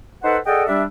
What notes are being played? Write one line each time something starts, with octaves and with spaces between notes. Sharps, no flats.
D#4 A4 B4 C5 F#5
G#4 A4 D5 D#5 F#5 G5
G3 D4 E5